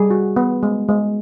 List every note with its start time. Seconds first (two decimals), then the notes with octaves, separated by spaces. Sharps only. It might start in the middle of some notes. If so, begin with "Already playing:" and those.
Already playing: G3 G#4
0.10 F#4
0.36 B3
0.63 G#3
0.89 G#3